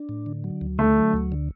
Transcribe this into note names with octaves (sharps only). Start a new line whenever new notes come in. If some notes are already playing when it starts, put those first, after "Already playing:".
Already playing: D4
A2
D3
F#3
D2
D3 A3
F#3
D2
D3